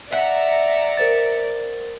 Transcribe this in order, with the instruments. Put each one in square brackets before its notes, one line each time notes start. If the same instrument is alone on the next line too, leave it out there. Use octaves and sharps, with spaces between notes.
[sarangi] D5 [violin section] E5 A#5 C#7 [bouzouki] F#5
[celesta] A#4 C5 A6